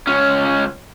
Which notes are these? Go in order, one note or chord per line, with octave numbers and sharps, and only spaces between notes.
C#2 C#4